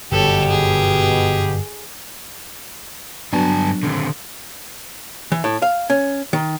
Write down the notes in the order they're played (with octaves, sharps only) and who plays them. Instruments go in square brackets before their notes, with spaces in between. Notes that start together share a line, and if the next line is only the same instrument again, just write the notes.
[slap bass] G1 F#2 [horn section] B2 G4 [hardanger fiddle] A4 C#5
[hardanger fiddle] G#4
[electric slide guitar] G2 G#5 A5 [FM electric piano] F#3 B3 D4
[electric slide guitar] D3 D#3 C4
[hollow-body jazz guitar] E3
A2
F5
C#4
D#3